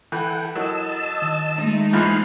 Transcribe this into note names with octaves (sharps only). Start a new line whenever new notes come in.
E3 A4 F#5 G5
F#3 E4 A#4 D#5 A5 E6
D#3
G#3 A3 D#4
G#2 E3 F3 C6 F6 F#6